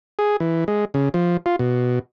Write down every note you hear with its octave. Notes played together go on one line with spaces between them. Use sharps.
G#4
E3
G#3
C#3
F3
F4
B2